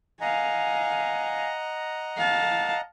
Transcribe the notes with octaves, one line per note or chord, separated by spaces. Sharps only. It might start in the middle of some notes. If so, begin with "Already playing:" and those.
D#5 F5 F#5 G#5 A#5
F5 A5